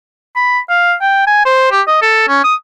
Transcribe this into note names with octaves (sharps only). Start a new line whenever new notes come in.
B5
F5
G5
G#5
C5
G4
D#5
A4
C#4
D#6